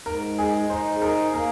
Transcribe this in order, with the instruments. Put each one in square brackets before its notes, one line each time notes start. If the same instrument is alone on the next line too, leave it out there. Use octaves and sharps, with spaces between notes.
[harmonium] G#2 [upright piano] A#4
[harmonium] G#3 [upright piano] G#4
[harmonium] D#4 [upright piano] C5
[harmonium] G#4 [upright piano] A#4
[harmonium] A#3 [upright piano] A#4